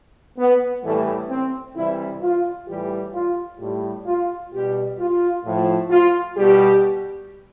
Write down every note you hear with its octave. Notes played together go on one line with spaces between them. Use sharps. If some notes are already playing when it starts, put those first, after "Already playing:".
B3
A2 E3 G3 A3
C4
C3 E3 G3 E4
F4
A2 E3 G3 G4
F4
A2 G3 G4
F4
B2 G3 G4
F4
A2 F3
F4
B2 G3 G4